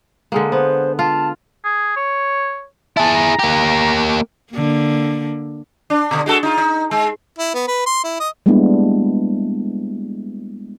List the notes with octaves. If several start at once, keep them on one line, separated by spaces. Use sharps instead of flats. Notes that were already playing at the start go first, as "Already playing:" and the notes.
D3 G#3 A#3
B3 C5
F4 A5
G#4
C#5
E4 G#4 A5
A#5
A#3 G4
D3 A#3
D4
B2 D3
G#3 F#4 A4
D#4 F4
D#4
G#3
E4
B3
B4
C6
E4
D#5
G3 G#3 A#3 B3 D4 E4